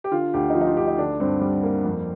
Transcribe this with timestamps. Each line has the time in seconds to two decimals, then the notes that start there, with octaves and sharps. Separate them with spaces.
0.04 G4
0.12 D3 F4
0.33 D2 G4
0.50 D#4
0.55 F3 F4
0.61 D#4
0.67 F4
0.77 D2 G4
0.87 D#4
0.98 D3 D4
1.20 G2 C4
1.41 G3
1.63 A#3
1.85 F2